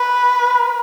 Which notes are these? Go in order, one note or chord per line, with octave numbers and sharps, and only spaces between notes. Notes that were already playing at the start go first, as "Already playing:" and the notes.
Already playing: B4